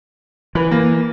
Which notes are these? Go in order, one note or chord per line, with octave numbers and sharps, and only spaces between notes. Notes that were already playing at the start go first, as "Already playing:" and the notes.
E3 B4
A#3